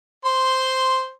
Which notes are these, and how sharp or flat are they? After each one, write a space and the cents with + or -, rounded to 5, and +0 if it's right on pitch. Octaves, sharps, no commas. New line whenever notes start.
C5 -5 C6 +0